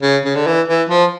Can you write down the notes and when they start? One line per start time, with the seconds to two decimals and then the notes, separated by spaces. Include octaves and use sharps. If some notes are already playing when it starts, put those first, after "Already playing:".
0.02 C#3
0.25 C#3
0.35 D3
0.47 E3
0.68 E3
0.89 F3